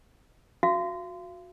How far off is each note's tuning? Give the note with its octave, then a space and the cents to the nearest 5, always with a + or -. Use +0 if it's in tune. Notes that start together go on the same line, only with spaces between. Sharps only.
F#4 -25 F5 -35